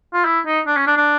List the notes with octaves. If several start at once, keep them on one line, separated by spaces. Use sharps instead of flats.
F4
E4
D#4
D4
C#4
D4
D4